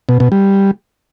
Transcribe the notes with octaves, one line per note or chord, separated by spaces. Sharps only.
B2
B2
G3